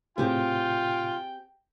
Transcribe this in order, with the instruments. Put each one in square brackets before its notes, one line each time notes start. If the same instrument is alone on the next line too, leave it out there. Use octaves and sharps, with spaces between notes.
[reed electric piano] A2 C3 [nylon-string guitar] C4 G4 G#4 [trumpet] F4 [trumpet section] G5